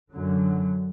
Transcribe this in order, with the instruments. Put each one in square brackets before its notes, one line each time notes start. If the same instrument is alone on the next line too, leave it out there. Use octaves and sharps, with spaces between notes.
[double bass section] F#2 D3 F#3